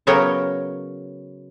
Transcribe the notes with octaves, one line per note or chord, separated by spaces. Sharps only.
C#3 F#3 B3 A#4 C#5 G5